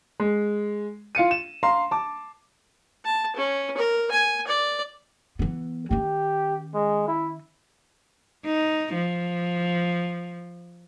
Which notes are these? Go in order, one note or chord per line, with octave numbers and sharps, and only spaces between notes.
G#3
F4 F5 C#7 D#7
E7
F5 A#5 C6
A5 D6
A5
C#4
A#4
G#5
D5
E3 B3
D#3 C#4 G4
G#3
E4
D#4
F3